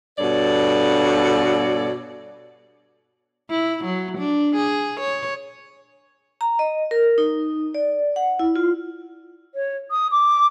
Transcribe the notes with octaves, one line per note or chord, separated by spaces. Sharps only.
G2 B2 A4 C#5 D5
E4
F#3
D4
G#4
C#5
A#5
D#5
A#4
D#4
D5
F#5
E4
F4
C#5
D#6
D6